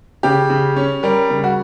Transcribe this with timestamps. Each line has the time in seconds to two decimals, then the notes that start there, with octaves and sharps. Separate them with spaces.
0.23 C#3 G4
0.50 C#3
0.77 C#4
1.03 G3 A#4
1.30 C#3
1.44 F#4